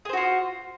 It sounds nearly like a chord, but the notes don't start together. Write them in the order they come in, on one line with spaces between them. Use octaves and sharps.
G#4 C5 F#4 F4